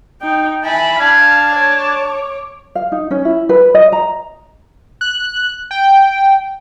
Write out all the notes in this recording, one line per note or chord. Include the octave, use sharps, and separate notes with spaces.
D#4 G5
E4 G#5 A5 B5
D4 F5 A5 G#6
C#5 D6
F5
D#4
C#4
E4
B4
D#5
A#5
F#6
G5